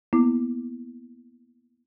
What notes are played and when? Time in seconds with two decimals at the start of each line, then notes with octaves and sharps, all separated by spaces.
0.13 A#3 B3 E4 D6